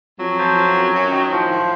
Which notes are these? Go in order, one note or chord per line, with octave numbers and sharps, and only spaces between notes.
F2 F#3
F3
F2
F#2
F#2
D#3
A2 F3
A2